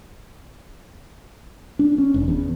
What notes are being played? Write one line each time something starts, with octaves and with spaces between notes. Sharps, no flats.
D4
C#4
F1
E2